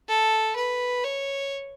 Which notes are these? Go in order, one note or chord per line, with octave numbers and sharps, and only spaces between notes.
A4
B4
C#5